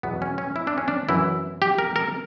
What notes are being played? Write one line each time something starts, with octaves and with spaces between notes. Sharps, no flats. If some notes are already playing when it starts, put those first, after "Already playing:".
E2 B2 F#3 B3
C#4
C#4
E4
D4
C#4
D4
F#2 E3 E4
G4
A#4
A#4